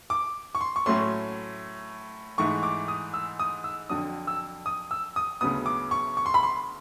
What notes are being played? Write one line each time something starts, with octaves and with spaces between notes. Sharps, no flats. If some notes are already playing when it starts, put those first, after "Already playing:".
D6
C#6
C6
C#6
A2 F#3 A3 C#4 C6
G#2 E3 A3 C#6
D6
D#6
E6
D#6
E6
F2 D3 F#3 D#6
E6
D#6
E6
D#6
D2 C#3 F#3 B3 D#6
D6
C#6
C#6
C6
B5
C6